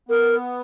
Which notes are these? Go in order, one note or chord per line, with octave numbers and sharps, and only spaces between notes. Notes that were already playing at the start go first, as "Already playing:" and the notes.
B3 A#4